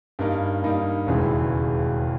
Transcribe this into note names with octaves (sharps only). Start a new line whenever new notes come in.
G2 G3 A#3 D#4
G2 G3 A#3 D#4
E1 D#2 C#3 E3 G#3